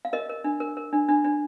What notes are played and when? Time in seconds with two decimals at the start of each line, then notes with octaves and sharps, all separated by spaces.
0.05 F5
0.13 A#4 D#5
0.29 A#4
0.44 D4
0.60 A#4
0.77 A#4
0.93 D4
1.09 D4
1.24 D4